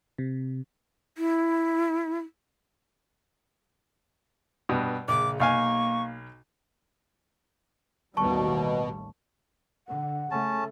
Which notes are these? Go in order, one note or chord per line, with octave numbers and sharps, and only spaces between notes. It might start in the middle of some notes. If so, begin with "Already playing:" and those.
C3
E4
G2 B2
A#1 C#3 D6
B1 A#3 F5 G#5 C#6
A1 D#2 B2 G3 A5 C#6
D3 F#5
C#3 A3 C#4 A5